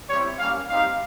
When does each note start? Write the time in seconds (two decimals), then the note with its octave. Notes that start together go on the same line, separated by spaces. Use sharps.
0.10 G3 C4 E4 G4 C#5
0.39 G3 A#3 C#4 F5
0.68 G3 C4 D#4 G4 F5